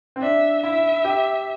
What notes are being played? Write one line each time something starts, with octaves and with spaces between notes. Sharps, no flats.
C4
D4 E5
E4 E5
G4